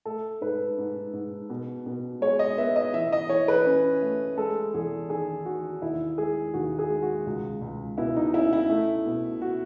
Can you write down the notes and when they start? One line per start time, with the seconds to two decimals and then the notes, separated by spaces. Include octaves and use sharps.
0.05 A3 A4
0.41 G#2 B4
0.78 G#2
1.13 G#2
1.50 B2
1.86 B2
2.21 G#3 C#5
2.39 D#5
2.58 B3 E5
2.76 D#5
2.94 E3 E5
3.13 D#5
3.29 E3 C#5
3.48 B4
3.66 C#4
4.02 A3
4.38 G#3 A4
4.74 E2 G#4
5.10 D#3 G#4
5.45 D#3 F#4
5.82 D#2 E4
6.18 G#3 G#4
6.54 D#2 F#4
6.79 G#4
6.90 G#3
7.02 F#4
7.27 C#2
7.62 C#2
7.98 B2 E4
8.16 D#4
8.34 C#4 E4
8.53 E4
8.70 A3
9.06 B2
9.42 F#4